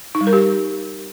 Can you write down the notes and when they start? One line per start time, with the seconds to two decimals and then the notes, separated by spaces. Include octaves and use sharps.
0.15 D#4
0.21 G3
0.27 A#4
0.33 G4